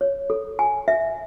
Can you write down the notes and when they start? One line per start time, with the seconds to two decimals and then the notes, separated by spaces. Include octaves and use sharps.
0.01 C#5
0.30 A4
0.59 G#5
0.88 E5